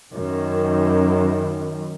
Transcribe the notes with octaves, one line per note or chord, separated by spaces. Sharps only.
F#2 D#3